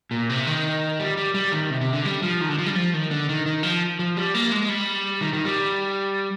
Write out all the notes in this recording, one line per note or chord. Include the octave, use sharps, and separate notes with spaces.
A#2
C3
D#3
G3
G3
G3
D#3
C3
C3
D3
G3
F3
D#3
D3
F3
G3
F3
D#3
D3
D#3
D#3
F3
F3
G3
A#3
G#3
G3
D#3
D#3
G3